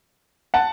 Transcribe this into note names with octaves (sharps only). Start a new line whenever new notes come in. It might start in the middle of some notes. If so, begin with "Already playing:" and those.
F#5 A5